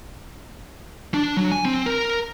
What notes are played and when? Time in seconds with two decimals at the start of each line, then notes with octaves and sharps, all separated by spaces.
1.14 D4
1.37 F#3
1.52 G#5
1.65 C4
1.86 A#4